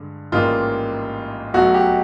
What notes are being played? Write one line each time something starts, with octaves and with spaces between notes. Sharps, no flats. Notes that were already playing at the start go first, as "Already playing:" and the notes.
Already playing: G2 D3 G#3
A1 G#2 D#3 G3 A#3 F4
B1 B2 F#3 A3 F#4
G4